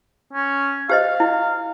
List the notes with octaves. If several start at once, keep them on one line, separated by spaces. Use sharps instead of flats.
C#4
G4 C5 D#5 F5
E4